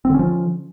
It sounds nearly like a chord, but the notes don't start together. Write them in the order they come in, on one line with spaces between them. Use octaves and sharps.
C4 D3 C#4 F3